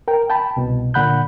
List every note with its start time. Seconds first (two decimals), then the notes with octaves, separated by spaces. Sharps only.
0.08 A#4 G5
0.30 G5 A5 B5
0.57 C2 B2
0.94 A#2 D3 F#5 B5 F#6 G6